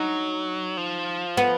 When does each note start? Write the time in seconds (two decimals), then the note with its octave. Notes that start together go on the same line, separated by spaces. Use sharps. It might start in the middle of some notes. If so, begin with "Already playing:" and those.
Already playing: F#3 D#4
0.77 F3
1.37 B3